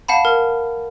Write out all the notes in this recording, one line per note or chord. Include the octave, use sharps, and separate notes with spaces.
F5 F#5 A5 B5
A#4